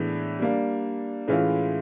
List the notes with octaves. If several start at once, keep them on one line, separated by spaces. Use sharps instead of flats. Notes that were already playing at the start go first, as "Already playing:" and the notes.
Already playing: A2 E3 G#3 B3 D4
G3 A#3 D4
A2 E3 G#3 C#4 F4